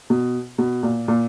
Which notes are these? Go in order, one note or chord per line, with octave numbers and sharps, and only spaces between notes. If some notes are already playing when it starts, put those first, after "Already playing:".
B2
B2
A#2
A#2